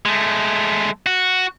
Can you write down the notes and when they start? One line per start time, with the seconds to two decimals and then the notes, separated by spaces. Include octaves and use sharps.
0.06 G#3 A3
1.06 F#4